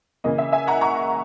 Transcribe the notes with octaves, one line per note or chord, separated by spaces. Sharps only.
C#3 E3 A#3 D#5
E5
E5 G#5
F#5 A#5
A#5 C#6